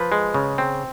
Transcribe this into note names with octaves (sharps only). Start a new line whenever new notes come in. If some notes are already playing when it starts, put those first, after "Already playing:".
Already playing: F3 B4
G#3
C#3
C4